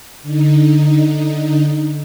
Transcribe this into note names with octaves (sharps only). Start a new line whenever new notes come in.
D3 D#4